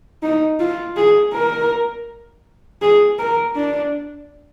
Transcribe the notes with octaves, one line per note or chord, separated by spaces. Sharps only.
D#4
F4
G#4
A#4
G#4
A#4
D4